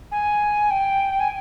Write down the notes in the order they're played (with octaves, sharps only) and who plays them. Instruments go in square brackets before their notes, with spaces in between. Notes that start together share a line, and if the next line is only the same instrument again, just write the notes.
[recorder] G#5
G5
G#5